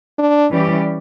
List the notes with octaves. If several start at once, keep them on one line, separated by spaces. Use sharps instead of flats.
D4
E3 G3 C#4 G4 D5